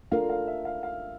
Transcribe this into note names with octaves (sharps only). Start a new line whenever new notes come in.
A3 D4 F4 A#4 F5
F5
E5
F5
F5